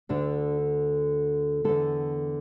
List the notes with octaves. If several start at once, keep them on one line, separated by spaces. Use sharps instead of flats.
D2 D3 D4
E2 D3 A4